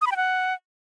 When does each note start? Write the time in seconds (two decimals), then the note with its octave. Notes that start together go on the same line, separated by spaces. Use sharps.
0.01 D#6
0.06 B5
0.12 G5
0.17 F#5